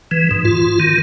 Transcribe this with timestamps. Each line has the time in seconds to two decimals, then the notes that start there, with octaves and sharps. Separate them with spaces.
0.11 E3
0.31 G#2
0.45 F4
0.80 D#3